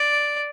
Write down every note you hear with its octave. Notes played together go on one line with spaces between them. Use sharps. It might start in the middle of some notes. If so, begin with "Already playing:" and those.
Already playing: D5